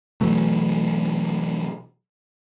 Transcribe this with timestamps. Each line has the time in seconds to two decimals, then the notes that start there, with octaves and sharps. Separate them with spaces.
0.21 B2 E3 F#3 A3